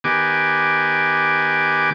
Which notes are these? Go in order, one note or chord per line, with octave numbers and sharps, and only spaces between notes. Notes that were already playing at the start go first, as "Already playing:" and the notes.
D#3 B3 G4 G#5 D6